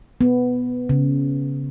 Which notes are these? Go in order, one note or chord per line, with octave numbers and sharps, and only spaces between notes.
B3
C#3